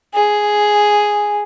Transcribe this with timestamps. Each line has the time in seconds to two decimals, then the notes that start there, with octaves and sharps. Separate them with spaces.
0.14 G#4